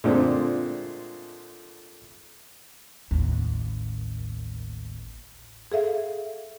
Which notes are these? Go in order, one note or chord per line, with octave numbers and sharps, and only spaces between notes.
A#2 D3 G#3 A3 C4
A1 D#2
G#4 A4 E5 F5